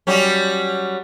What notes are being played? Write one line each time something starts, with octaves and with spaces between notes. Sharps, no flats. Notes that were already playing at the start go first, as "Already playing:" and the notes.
F#3 G3 C#4